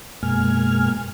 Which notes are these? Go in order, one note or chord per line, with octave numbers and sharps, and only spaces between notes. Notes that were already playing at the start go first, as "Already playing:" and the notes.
F#2 B2 G#3 A#3 G#5 F6